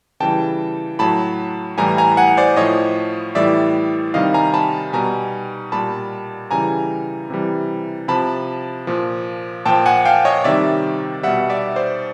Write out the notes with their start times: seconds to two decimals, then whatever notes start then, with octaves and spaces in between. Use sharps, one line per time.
0.20 C#3 E3 G3 G5 A5
0.99 A2 F#3 A5 B5
1.78 A2 E3 G3 G#5 A#5
1.98 G#5 A#5
2.17 F#5 G#5
2.37 C5 D5
2.56 A2 F3 C#5 D#5
3.35 A2 E3 G3 D5 E5
4.14 C3 D#3 G3 D#5 F5
4.34 G#5 A#5
4.54 A5 B5
4.93 B2 G3 G#5 A#5
5.72 A#2 G3 A5 B5
6.51 C#3 E3 G3 G#5 A#5
7.30 C3 E3 G3
8.08 C3 F3 A5 B5
8.87 A#2 F3
9.66 A#2 F3 G5 A5
9.86 F#5 G#5
10.05 F5 G5
10.25 C#5 D#5
10.44 C3 D#3 G3 D5 E5
11.23 B2 G3 E5 F#5
11.50 D5 E5
11.76 C5 D5